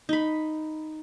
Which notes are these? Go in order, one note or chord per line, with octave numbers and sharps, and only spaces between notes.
D#4 B5